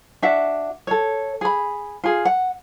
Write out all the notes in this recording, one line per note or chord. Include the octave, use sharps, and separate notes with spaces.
D4 F#4 E5 F#5
A4 C#5
G#4 B5
F4 G#4
F#5